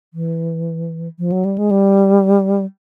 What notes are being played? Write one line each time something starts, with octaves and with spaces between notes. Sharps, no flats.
E3
F3
F#3
G3
G#3
G3